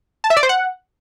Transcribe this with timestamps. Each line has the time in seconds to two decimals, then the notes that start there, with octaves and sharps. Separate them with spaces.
0.24 A5
0.30 E5
0.37 D5
0.43 C5
0.49 F#5